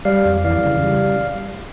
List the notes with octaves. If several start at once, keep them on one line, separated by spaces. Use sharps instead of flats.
G3 D5 F5
F2
E3 D5 F5
C#3
G3